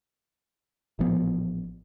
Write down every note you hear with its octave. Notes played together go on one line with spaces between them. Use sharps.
A1 A#2 F3 B3